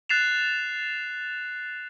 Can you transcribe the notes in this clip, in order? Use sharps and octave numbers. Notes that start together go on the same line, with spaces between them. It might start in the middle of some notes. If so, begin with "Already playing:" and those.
F#6 A6 C7 E7 F7